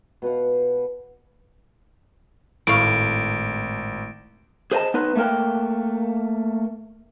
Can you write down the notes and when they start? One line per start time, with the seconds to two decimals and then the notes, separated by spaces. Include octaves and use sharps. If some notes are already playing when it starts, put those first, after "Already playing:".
0.22 B2 B4 F5 F#5
2.67 G#1 A2 F5 D7
4.72 G#4 C5 D#5 G#5 A5
4.94 B3 D#4 B4
5.16 A3 A#3 A#4 G5